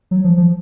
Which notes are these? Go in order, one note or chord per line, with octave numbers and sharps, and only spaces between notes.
F#3
F3
F3